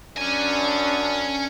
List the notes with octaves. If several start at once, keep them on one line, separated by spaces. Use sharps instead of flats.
F#2 C#4 D4 G#5